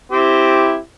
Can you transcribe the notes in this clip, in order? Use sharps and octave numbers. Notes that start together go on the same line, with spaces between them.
C4 E4 G4